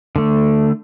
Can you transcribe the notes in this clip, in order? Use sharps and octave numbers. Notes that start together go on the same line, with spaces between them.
D3 A3